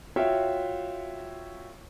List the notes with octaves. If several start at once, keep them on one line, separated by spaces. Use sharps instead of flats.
F4 F#4 C#5 E5 F5 G5